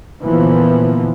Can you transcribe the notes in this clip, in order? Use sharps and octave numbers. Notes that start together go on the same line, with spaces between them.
A#2 D3 E3 F3 A#3 B3